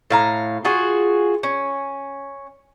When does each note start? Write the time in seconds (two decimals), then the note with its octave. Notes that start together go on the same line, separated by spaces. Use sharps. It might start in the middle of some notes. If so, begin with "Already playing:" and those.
0.10 A2 F5 A#5
0.65 F4 F#4 G#4
1.43 C#4